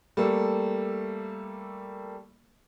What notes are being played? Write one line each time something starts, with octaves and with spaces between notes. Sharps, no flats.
G3 A3 A#3 A4